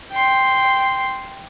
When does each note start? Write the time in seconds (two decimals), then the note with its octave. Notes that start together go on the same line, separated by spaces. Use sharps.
0.12 G5 C6